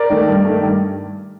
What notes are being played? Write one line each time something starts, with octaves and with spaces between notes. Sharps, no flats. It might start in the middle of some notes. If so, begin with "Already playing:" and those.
Already playing: A#4 D5
D#3 A3
G2
D#3 A3
G2